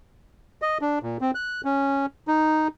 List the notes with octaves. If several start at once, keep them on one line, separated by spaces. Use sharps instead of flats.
D#5
D4
A#2
C4
F#6
C#4
D#4